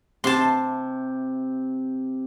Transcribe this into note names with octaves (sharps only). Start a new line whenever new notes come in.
C3 A5 C6